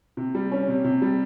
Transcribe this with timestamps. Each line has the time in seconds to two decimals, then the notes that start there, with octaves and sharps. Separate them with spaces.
0.17 C3
0.35 G3
0.52 C#4
0.68 C3
0.84 C3
1.02 G3